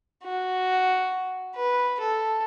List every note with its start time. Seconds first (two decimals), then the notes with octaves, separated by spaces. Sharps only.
0.24 F#4
1.56 B4
2.00 A4